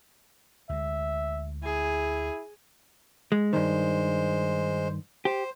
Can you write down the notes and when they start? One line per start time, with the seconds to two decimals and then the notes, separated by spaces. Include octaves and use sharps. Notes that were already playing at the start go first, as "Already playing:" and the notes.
0.69 D2 G#3 E5
1.64 E4 G#4
3.32 G#3
3.53 G2 D#3 G#3 C5
5.25 G4 C5